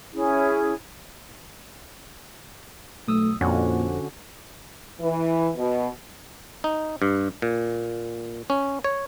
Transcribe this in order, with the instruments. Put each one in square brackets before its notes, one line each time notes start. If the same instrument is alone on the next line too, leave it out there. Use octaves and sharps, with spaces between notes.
[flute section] C#4 E4 G#4
[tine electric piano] B1 D#6 E6 [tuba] A3
[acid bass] F2 [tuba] A#2 [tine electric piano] D3 C#4 F#4
[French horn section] E3
B2
[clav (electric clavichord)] D#4
G2
A#2
C#4
C#5